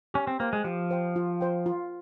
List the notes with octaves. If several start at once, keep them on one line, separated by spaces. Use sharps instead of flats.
C#4 G4
C4
A#3 C5 G5
G#3
F3 G4
C5 G5
F4
C5 G5
F4